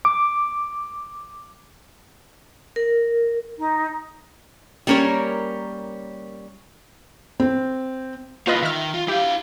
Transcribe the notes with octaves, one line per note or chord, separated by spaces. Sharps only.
D6
A#4
D#4
G3 A#3 C#4 A#4 C#5
C4
A#3 E4 F4 B4 D#5
D#3 E5 F6
F4
E4 G4 F5